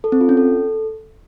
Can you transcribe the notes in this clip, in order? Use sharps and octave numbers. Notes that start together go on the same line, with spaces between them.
A4
C4
F4
C#4
A4